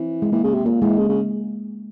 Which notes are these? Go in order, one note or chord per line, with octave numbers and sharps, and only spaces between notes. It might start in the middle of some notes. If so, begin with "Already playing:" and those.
Already playing: E3 C4
G#3
E3 A#3
C#3
C3
A#2 A#3
E3 G#3
C#3
C#3